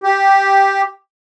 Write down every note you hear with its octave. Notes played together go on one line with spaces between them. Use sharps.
G4